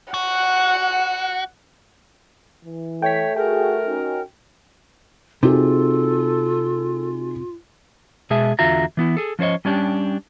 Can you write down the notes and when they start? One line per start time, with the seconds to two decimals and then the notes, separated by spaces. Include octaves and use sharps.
0.14 F#4 F#5
2.64 E3
3.02 A3 C#5 G5 B6
3.36 F#4 G#4 A#4 G5
3.86 C#4 D#4 F#4
5.43 C3 D#4 F4 F#4 G#4 A4
8.30 B2 G#3 G#4 E5 A5
8.59 E2 D3 F4 F#4 E5 A#5
8.97 E3 B3 E4
9.17 G#4 A4
9.39 F3 C#4 C5 C#5 D#5
9.65 G3 C#4 D4 G4